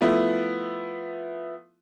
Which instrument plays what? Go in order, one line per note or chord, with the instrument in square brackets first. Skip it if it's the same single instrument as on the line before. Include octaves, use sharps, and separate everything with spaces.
[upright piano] F3 A3 B3 E4